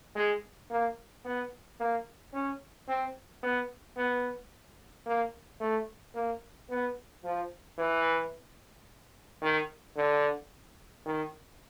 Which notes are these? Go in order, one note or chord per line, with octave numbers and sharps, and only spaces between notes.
G#3
A#3
B3
A#3
C#4
C4
B3
B3
A#3
A3
A#3
B3
F3
E3
D#3
D3
D#3